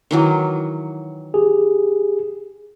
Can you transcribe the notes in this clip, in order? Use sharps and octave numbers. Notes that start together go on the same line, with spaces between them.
D#3 E3 F#3
G4 G#4